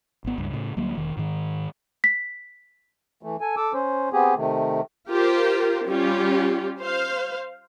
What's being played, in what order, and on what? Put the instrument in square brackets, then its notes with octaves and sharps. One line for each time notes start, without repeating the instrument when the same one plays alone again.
[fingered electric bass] G#1 B3
C#2 G2
A2 C#3
D2 F#3 G3 A#3
E1 D#3
G#2 D#3
[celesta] B6
[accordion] E3 A3
A4 G#5
A4 D6 E6
C#4 C5
B3 C4 G4 G#4
C3 D#3 A3
[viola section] F4 G4 A#4 C5
G3 C#4 F4 G4
C5 F5